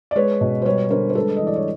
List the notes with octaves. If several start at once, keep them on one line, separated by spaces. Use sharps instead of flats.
D5
G#3 B4 C#5
B2
C5
G3 B4 C#5
D3 A#4 C5
C5
G#3 A4 B4
E3 D#5
D5
C#5